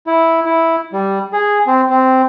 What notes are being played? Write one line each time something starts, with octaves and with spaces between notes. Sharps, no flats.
E4
E4
G3
G#4
C4
C4